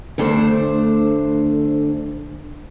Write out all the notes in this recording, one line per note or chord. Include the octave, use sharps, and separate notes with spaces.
D2 A3 D4 C5